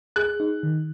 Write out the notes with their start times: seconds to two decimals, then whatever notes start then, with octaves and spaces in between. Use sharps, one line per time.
0.16 G#4 F#6
0.40 D#4
0.63 D#3